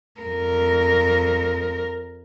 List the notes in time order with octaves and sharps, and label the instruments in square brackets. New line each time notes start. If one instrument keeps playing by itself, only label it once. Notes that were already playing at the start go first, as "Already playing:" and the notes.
[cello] F2 A#4